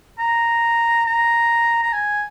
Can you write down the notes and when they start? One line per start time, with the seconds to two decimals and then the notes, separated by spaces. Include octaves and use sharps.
0.19 A#5
1.06 A#5
1.83 A#5
1.93 G#5